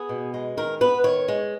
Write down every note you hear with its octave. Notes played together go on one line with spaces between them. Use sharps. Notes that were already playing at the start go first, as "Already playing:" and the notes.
Already playing: B3 G#4
B2
G#3
D#3 A#4
B3 B4
D#3 C#5
G#3